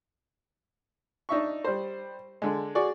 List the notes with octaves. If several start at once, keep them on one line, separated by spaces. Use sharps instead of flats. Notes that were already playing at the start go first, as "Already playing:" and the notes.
D4 D#4 E5 C#6
G3 C5
D3 G#3
F#4 G#4 D5 C#6